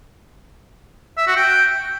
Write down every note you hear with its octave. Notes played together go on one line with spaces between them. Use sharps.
E5
F#4
G5